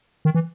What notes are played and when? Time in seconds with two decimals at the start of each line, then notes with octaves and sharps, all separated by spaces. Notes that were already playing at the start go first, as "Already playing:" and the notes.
0.25 D#3
0.35 E3